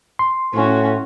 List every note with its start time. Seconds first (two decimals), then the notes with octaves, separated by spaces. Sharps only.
0.19 C6
0.54 A2 C#4 F#4